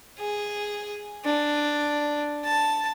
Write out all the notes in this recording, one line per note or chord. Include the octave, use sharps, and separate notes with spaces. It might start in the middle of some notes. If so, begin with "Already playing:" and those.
G#4
D4
A5